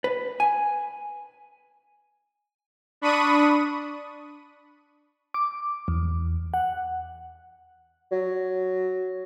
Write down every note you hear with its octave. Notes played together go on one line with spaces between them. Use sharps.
B4
G#5
D4 B5 C#6 D#6 D#7
D6
E2
F#5
F#3